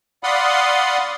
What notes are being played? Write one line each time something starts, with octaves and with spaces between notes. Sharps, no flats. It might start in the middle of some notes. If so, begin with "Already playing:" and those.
D5 F5 F#5 B5 C6 D#6